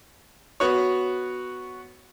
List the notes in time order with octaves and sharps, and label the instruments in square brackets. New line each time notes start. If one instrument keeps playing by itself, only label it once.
[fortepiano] B3 F#4 C#5